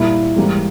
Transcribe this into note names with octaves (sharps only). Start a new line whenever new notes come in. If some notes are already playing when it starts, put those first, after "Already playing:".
Already playing: A#2 G3 A#3 E4
G#2 E3 G3 A#3